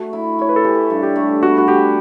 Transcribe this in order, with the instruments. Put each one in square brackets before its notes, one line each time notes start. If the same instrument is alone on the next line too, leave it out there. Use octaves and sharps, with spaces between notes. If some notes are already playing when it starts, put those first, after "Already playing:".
Already playing: [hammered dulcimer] A3 [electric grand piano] F#4
[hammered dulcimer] E4
[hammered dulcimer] E4 [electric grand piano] C#5
[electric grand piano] B4
A4
[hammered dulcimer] E3 [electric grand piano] G4
[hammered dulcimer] G2
[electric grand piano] G4
[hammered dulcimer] A3
[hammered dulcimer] B3 [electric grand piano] F#4
[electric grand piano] F#4
[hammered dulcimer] B3 [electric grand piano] G4